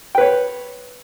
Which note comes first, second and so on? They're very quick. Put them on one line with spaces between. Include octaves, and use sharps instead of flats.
G5 B4 C#5